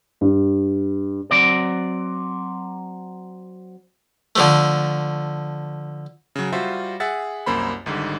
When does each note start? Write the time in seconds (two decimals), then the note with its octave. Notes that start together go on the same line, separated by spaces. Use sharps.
0.21 G2
1.31 F#3 C4 D5
4.36 D3 F3 A3
6.36 C#3 F#3
6.52 G3 F4 F#4 C5 E5
7.00 G#4 E5 F#5 A6
7.46 C2 F#2 A#3 C5 B5
7.86 G#1 G#2 D3 G3